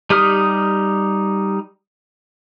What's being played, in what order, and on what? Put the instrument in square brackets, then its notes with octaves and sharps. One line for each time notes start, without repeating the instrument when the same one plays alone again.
[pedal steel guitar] G3 D#4 G4 D#6 F6